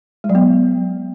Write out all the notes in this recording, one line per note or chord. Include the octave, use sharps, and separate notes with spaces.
G#3
F#3
B3